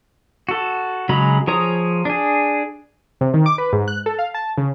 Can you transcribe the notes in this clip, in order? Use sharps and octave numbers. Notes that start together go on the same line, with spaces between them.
F#4 A4
C#3 F#3 G#3 A#5 B5
F3 G#4 C#5 A#5 D#6
D4 G#4
C3
D#3
D6
B4
G#2
F#6
A4
F5
A5
C#3